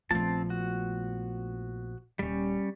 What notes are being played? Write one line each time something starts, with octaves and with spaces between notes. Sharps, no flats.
A#1 F3 A3 B3 C4 A5
F#4
D#1 G3 C#4